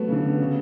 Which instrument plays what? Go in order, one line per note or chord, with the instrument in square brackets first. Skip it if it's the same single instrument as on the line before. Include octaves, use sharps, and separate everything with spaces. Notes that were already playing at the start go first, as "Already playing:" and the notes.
Already playing: [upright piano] F#3 A3 [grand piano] B3 F#4
[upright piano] C#3
D3
C#3